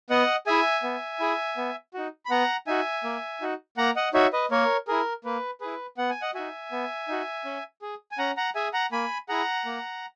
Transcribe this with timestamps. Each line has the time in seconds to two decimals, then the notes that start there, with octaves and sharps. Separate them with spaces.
0.10 B3 D#5 F#5
0.47 E4 G#4 E5 G#5
0.83 B3
1.20 E4 G#4
1.57 B3
1.94 D#4 F#4
2.25 B5
2.30 B3 F#5 A#5
2.67 D#4 F#4 E5 G#5
3.04 A#3
3.41 D#4 F#4
3.77 A#3 F#5 A#5
3.96 D#5 F#5
4.14 D#4 F#4 C#5 E5
4.33 B4 D#5
4.51 A#3 A#4 C#5
4.88 E4 G#4 A#4
5.25 A#3 B4
5.61 E4 G#4 B4
5.98 B3 F#5
6.10 G#5
6.22 D#5 F#5
6.34 D#4 F#4 E5 G#5
6.72 B3
7.08 D#4 F#4
7.45 C#4
7.82 G#4
8.11 G#5
8.18 C#4 F#5 A#5
8.37 F#5 A#5
8.55 G#4 E5 G#5
8.73 F#5 A#5
8.92 A#3 G#5 B5
9.28 E4 G#4 F#5 A#5
9.65 A#3